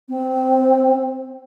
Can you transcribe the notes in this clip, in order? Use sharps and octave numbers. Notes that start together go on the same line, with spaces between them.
C4